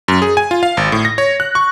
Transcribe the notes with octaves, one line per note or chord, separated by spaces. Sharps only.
F#2
G#4
G#5
F4
F5
G#1
A2
A#6
C#5
F#6
C#6